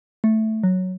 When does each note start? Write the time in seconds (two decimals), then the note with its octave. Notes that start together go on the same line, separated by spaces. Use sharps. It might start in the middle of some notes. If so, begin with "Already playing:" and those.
0.24 A3
0.63 F#3